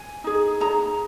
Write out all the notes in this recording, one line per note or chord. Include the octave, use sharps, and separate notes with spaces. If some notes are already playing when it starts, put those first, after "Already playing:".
Already playing: G#5
D#4 G#4
D#4 G#4 A#5